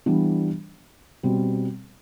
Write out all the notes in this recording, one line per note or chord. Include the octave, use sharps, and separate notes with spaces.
E3 G3 B3 D4
B2 G3 C4